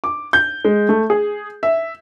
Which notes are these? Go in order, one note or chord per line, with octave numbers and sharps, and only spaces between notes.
D6
G6
G#3
A3
G#4
E5